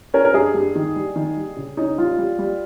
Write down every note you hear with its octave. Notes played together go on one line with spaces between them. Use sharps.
C#4 A#4
A#4
G2 G#4
G2
D#3
G3
D#3
G3
C#3
C#4 D#4
G3 F4
G3
G3